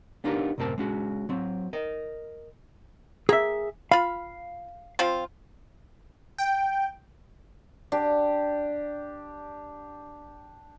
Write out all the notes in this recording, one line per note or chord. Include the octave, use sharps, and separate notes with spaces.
B3 D4 D#4 F4 G4 A#4
C2 F#2 A2 C4 A#4 A5
G#3 C#4 F#4
F#3 C4
A#4 D#5
A#3 G#4 E5
F4 F5 B5
F3 C4 F4
G5
D4 G4